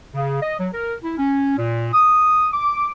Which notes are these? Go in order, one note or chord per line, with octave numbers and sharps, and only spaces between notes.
C#3
D#5
F#3
A#4
E4
C#4
A#2
D#6
D6